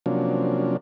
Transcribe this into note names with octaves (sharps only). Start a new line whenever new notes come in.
C3 F3 F#3 A#3 C#4 D4